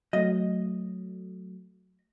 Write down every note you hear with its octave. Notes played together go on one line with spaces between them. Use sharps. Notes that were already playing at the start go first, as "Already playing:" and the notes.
F#3 A3 D#5